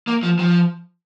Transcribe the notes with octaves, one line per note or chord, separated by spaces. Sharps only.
A#3
F3
F3